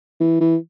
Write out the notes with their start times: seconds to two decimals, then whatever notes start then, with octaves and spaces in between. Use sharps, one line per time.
0.20 E3
0.41 E3